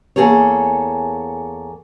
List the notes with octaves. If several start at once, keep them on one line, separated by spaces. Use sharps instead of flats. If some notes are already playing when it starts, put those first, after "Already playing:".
E2 A#3 G#4 A4 C#5